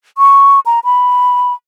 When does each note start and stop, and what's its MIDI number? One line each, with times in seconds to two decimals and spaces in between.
0.18 0.60 85
0.66 0.80 82
0.84 1.53 83